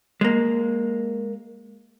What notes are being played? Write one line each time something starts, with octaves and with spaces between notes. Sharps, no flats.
G#3 A#3